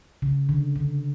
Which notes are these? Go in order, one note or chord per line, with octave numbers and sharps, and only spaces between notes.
C#3
D3
D3